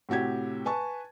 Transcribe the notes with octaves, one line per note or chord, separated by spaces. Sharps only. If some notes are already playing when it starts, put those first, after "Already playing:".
A2 C3 F#4 G4 G#6
B4 G#5 A5 C#6